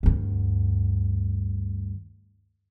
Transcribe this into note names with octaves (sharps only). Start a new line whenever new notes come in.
D2 G2